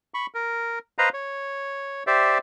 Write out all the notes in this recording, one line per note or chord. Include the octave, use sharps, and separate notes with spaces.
B5 C#6
A#4
B4 C5 D#5 F5 A#5
C#5
G4 C5 D5 E5